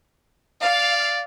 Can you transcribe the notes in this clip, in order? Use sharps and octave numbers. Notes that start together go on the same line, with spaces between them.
D5 F5